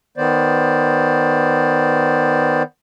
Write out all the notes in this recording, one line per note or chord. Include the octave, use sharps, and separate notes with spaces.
D#3 B3 C5 D5